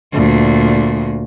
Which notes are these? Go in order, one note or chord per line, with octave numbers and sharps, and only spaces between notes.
D2 A#2